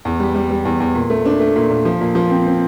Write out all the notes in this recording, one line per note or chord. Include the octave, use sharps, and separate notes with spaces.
E2
G3
G3
G3
E2
E2
A#2
A3
D4
A3
A#2
A#2
F3
A#2
F3
C4
C4